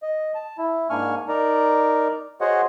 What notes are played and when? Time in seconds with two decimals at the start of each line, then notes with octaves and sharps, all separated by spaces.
0.02 D#5
0.35 A5
0.58 E4
0.90 G#2 A#3 D4 G#5 C#6 F6
1.28 D#4 A#4 D5 A#5
2.41 F#4 G#4 C5 C#5 D#5 F#5